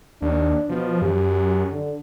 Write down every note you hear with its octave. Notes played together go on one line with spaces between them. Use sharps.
D#2 D4
B2 F3
F#2 G4
D3